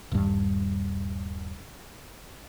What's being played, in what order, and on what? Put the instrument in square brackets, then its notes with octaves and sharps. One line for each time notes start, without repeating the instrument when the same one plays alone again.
[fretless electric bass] D#1 G2